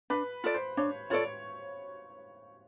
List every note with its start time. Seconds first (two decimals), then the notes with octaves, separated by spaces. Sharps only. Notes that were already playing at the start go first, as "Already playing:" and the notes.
0.10 D4 B4
0.44 F4 A4 D5
0.54 C5
0.77 D4 C#5
1.10 F4 A4 C#5 D5